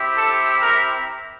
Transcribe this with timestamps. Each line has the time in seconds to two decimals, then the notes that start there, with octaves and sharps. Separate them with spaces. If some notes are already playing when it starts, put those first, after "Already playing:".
Already playing: C4 E4 G4
0.17 A4
0.62 A#4